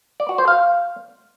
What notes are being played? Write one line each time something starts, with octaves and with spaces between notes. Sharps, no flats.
D5
F#4
C5
F5